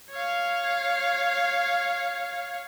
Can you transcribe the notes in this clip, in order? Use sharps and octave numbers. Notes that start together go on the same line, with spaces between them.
C#5 F5